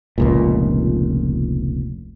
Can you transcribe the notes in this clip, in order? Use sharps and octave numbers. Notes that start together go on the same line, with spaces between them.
F1 C#2 A#2